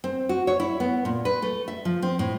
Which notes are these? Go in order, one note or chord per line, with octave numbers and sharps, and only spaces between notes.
C4
F#4
C#5
E4
B3
A#2
B4
A3
E5
F3
C4
A2